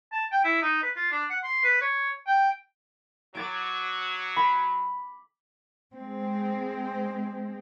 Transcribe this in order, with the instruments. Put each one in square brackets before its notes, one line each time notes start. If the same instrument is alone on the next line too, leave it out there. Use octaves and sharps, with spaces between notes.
[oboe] A5
G5
E4
D#4
B4
F4
D4
F#5
C6
B4
C#5
G5
[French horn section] F#3 [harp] D6 A6 D7
[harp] B5
[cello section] G#3 C4